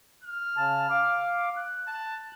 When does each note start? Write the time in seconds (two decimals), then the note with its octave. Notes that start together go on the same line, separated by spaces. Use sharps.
0.23 F6
0.57 C#3 A5
0.90 F5 D6
1.57 F#6
1.88 A5